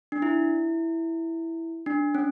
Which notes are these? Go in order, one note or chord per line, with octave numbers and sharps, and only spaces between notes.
D4
E4
D4
C#4